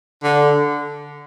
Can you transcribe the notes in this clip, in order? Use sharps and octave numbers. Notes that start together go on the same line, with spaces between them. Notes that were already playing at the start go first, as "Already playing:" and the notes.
D3